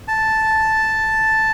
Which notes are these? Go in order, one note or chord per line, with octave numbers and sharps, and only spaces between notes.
A5